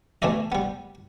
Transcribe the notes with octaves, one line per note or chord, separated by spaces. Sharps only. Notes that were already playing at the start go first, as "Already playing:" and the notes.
B2 E3 A3 D5 D#5
G3 B3